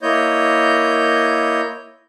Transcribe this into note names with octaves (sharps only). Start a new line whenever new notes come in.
A#3 E4 C#5 D#5 G6